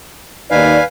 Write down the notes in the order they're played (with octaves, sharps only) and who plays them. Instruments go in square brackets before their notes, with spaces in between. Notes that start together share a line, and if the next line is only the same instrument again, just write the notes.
[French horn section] D#2 D#4 D5 [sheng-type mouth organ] B4 F5 G#5